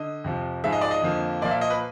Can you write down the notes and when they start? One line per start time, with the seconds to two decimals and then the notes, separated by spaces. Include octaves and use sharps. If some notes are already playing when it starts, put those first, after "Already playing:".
Already playing: D3 D#5
0.24 F2 C3 F3
0.64 G#2 F3 G#3 E5
0.72 D#5
0.81 D5
0.91 D#5
1.02 F2 D3 F3 A#3
1.41 A#2 F3 A#3 D5
1.51 E5
1.61 D#5
1.70 B4